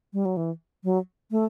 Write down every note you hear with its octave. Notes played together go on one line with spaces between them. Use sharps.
G3
F#3
E3
F#3
A3